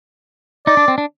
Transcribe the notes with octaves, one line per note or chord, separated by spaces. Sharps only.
D#4 D5
D4
C4
D4